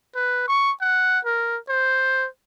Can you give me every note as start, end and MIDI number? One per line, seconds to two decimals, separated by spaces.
0.15 0.45 71
0.48 0.72 85
0.81 1.19 78
1.25 1.57 70
1.69 2.27 72